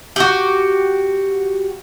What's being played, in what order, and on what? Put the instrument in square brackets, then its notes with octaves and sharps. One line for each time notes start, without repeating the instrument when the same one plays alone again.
[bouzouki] F#4 G4